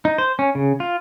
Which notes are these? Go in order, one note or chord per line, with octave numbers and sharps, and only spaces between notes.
D#4
C5
C#4
C#3
F4